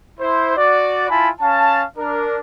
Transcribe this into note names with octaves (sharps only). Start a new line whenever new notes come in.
E4 C5
F#4 D5
E4 F4 G#5 A5 B5
C#4 F5 A5
D4 A#4